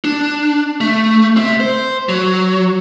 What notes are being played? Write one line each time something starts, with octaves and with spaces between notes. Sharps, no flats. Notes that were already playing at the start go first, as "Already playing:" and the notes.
D4
A3
C4 E5
C5
F#3